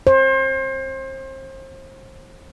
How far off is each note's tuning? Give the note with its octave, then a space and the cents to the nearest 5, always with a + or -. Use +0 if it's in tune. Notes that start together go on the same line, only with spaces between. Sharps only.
C5 +35